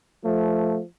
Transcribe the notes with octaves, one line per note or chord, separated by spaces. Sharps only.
F3 A3